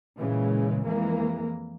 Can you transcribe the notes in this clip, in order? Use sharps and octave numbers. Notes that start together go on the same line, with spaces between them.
A#2 C#3 E3 G#3
F2 E3 G#3 A#3